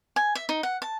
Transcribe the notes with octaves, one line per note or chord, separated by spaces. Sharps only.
G#5
E5
D#4
F#5
A5